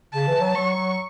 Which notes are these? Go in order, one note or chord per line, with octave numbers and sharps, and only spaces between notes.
C#3 A5
E3
F#3
F#3 C#6
F#3